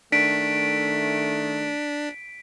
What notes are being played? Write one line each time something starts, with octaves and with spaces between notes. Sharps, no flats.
D#3 A3 D4 B6 D7